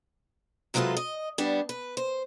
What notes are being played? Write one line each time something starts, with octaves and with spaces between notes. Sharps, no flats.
C3 F#3 G#3 F4 A4 B4
D#5
G3 B3 D4
B4
C5